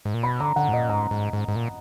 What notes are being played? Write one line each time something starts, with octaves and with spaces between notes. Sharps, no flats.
G#2
A#2
B2 B5
D3 A#5
D3 F#5
G#2
A#2 D#5
G#2 A#5
G#2
G#2
G#2
A#2